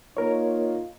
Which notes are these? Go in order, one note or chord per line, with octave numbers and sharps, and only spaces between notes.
A#3 D#4 F4 A#4 C#5